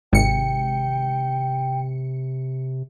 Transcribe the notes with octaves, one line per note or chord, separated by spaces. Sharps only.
G#1 C3 G5 C#7